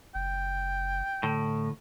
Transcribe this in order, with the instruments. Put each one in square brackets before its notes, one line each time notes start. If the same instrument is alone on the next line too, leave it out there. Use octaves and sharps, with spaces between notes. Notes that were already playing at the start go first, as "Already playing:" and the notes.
[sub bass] F#1 [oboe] G5
[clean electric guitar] A2 [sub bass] D3